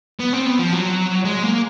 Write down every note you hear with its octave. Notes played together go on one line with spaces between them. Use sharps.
B3
C4
B3
F3
F#3
G#3
A#3